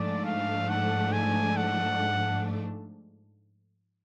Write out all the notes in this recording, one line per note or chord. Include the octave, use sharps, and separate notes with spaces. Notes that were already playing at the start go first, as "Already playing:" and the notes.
Already playing: G#2 F3 A3 D4 D5
F5
F#5
G#5
F#5